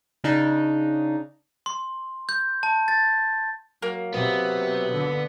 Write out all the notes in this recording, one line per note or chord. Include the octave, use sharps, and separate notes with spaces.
C#3 D4 D#4
C6
G6
A5
A6
F#3 A#3
C3 F#3 B3
D3